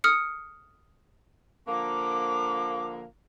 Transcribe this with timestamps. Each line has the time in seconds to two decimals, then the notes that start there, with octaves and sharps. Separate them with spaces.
0.04 D#6 F6 C#7
1.68 D3 F3 A#3 D6